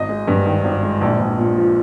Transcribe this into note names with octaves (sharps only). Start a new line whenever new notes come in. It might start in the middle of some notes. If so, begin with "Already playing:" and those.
Already playing: G#1 D#5
G#3
G2
D#3
G#1
G#3
A#1
A#1
A#2
F3